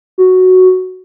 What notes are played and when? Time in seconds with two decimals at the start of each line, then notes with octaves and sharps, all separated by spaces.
0.18 F#4